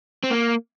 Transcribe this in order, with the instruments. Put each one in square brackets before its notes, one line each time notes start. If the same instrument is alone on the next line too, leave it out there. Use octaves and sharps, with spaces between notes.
[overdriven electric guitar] C4
A#3